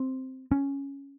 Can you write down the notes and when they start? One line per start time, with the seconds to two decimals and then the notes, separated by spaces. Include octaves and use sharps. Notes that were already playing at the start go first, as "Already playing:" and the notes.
Already playing: C4
0.52 C#4